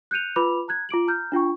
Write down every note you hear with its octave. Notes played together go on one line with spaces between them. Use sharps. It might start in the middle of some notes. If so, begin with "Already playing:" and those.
F#6 G6 C#7 D#7 F7
F4 B4 B5 D6 F7
A#5 F#6 G#6
F4 D6 D7 F#7
A#5 F6 G6
D4 F4 G5 C#6